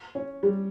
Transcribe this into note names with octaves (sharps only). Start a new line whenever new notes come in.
C#4
G3